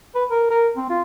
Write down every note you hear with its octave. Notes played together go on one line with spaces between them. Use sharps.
B4
A#4
A#4
C4
F4